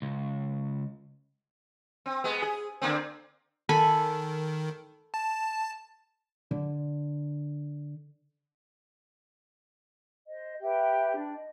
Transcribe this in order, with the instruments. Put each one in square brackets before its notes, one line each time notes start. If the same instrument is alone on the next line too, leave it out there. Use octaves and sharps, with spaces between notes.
[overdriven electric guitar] C#2
[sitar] C4
G#3 B3
G#4
D3 A#3 C4
[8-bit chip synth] D#3 [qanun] A4 G#5 B5
[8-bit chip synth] A5
[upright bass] D3
[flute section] C5 D#5
G4 B4 E5 G5
D4
D#5